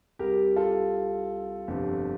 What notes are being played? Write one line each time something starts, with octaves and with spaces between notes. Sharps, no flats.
C2 C3 G3 G4 A#4
F4 A4
G1 F2 C3